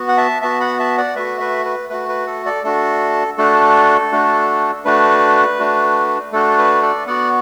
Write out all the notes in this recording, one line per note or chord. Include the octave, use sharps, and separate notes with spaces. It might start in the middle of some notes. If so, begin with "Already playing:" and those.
Already playing: B3 F#4
F#5
E5 A5
B3 F#4 E5 A5
F#5 B5
E5 A5
D5 F#5
A3 F#4 B4 E5
B4 E5
B4
A3 F#4 B4
B4
A4
A4 D5
A3 D4 F#4 A4
A3 D4 F#4 A4
A3 D4 F#4
A3 D4 F#4 B4
A3 D4 F#4
A3 D4 F#4 A4
B4
A4 D5
B3 F#4 D5 F#5